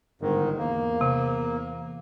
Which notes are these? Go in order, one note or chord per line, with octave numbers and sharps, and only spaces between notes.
G1 G#2 D#3
E2 A#3
C3